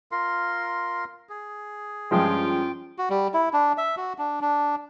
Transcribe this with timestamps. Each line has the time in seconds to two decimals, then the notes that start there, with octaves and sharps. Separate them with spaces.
0.12 F4 A#4 C6
1.29 G#4
2.11 G2 F3 G#3 C#4 F4 G5
2.98 F#4
3.10 G3
3.34 E4
3.53 D4
3.78 E5
3.97 F#4
4.18 D4
4.41 D4